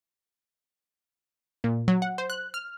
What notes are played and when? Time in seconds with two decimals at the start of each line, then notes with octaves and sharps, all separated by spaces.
1.64 A#2
1.88 F#3
2.02 F#5
2.18 C5
2.30 F#6
2.54 F6